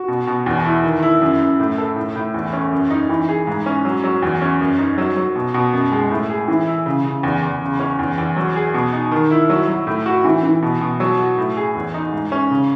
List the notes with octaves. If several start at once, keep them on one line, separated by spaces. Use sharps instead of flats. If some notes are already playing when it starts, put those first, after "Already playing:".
Already playing: F#4
B2
B2
E2
E4
D#3
E4
F#2
F#2
A2
A4
A2
A2
E2
C#4
F#2
D#4
E3
G#4
G#2
C#4
F#3
F#3
E2
C#4
F#2
D#4
F#3
F#3
B2
B2
F#2
G#3
A2
G#4
E3
E4
C#3
C#3
E2
E2
C#3
C#4
E2
E2
F#3
G#4
B2
D#4
D#3
E4
F#3
F#3
A2
F#4
E3
E3
B2
B2
F#3
F#4
A2
G#4
E2
D#4
G#2
C#4
C#3